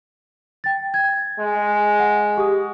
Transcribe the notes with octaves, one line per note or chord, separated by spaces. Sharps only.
G5 A6
G#6
G#3
F#5
G4 D#6